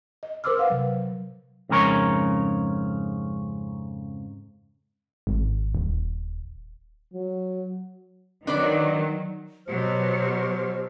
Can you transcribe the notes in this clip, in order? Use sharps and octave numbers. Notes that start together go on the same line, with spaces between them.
D#5
A#4 C5 C6 D6 E6 F6
B4 F5 F#5
C3 F#3
F2 G#2 C#3 A#4 C#5
G#1
D#1
F#3
D#3 F#3 D4 B4 D5
B2 F#3 G4 C5 F6